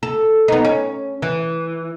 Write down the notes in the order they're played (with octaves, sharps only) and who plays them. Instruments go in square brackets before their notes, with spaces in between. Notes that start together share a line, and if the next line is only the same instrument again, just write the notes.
[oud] A4
B3 D#4
C#4
E3